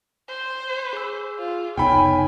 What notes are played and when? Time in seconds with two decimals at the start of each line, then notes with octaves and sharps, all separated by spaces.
0.29 C5
0.93 G#4 E6
1.39 F4
1.77 F1 C#2 B3 D#4 C#5 G5 G#5 B5